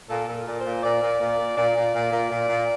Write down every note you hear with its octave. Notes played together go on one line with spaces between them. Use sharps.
A#2 A4
A#2
A#4
A#2 D5
C5
A#2
A#2 D5
A#2
A#2
A#2
A#2 D5
A#2
A#2
A#2
A#2
A#2